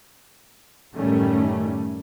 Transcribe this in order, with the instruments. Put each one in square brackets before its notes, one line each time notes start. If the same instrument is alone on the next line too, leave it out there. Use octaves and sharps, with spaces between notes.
[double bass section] F#2 A2 D#3 G3 A3 C#4